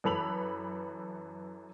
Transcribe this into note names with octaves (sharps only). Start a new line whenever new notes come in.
F#2 E3 A4 B5 F7 F#7